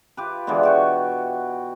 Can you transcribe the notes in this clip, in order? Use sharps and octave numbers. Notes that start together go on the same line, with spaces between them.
F4 G4 B4
B2 D3 E3 G#3
F#4 G5 C#6